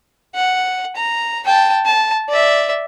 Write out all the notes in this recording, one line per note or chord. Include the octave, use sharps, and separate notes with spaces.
F#5
A#5
G5 A5
A5
D5 E5